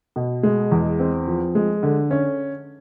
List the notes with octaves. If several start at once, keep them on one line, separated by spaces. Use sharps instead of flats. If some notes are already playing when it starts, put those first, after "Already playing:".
B2
G#3
E2
C4
F3
G#3
D3
C#4